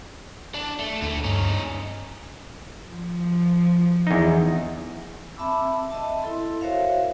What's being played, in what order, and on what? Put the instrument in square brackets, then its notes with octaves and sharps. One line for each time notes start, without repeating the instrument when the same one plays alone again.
[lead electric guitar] D4
A3
[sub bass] D2 [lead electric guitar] D3 A3
[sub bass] G2 [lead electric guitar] C#4 D#4
[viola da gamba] F3
[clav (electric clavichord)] E2 D#4
[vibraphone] C4 E5 A5 B5 D6 E6
D#5 E5 A5
E4 A4 C6
F#4 A#4 C5 C#5 E5 F5